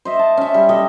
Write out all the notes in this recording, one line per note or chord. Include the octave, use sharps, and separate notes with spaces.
C5 D#5 E5
A5
C#4 E5
G3
G4 A4 C#5 D#5